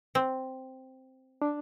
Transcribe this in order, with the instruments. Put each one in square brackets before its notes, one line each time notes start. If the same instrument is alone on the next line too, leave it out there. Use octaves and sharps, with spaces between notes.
[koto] C4
[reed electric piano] D4